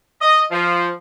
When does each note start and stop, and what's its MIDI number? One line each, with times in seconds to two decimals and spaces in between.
0.22 0.43 75
0.51 0.90 53